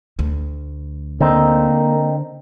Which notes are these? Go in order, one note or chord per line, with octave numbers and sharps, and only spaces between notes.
D2
D3 A#3 C4 D#4